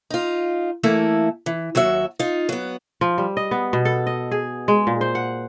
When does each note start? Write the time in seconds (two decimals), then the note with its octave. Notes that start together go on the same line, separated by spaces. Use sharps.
0.10 D#4 F4
0.83 E3 A3 A#3 E4
1.46 E3
1.75 D#2 F#3 F#4 E5
2.19 D#4 F4
2.49 F#3 B3
3.01 F3
3.18 G3
3.37 D#5
3.51 B3
3.73 B2
3.85 A4
4.07 D#5
4.31 G#4
4.68 G#3
4.87 A#2
5.01 C5
5.15 F#5